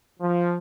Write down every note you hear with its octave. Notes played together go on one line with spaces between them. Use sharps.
F3